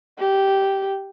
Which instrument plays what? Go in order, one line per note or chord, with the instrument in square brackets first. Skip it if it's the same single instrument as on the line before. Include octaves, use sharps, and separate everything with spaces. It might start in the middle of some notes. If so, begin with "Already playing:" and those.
[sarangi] G4